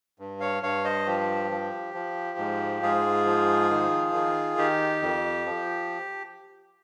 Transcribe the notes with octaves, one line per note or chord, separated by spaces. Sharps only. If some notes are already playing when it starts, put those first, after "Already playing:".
G2
C#5 F5
G2 C#5 F5
C5 D#5
F3 G4
F3
F3
G#2
G#2 F4 G#4
F3
D#3
D#3
D#3 G4
F2
F3